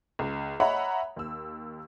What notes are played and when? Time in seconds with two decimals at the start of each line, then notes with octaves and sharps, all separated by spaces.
0.19 C#2
0.60 C#5 D#5 E5 F#5 A#5 B5
1.16 D#2 E6